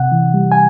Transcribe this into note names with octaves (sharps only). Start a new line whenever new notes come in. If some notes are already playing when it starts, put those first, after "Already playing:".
Already playing: C3 F#5
E3
G3
G#5